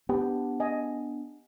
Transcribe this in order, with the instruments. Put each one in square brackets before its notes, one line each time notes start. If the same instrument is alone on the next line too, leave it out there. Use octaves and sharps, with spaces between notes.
[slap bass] B3 D4 [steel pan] G4
[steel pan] D#5 G#5